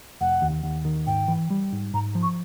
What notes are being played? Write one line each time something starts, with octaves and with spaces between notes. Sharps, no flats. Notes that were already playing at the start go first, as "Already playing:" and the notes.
F1 F#5
D#2
D#2
D#3
G#2 G5
E3
G3
G#2
G#2 A#5
F3
C#6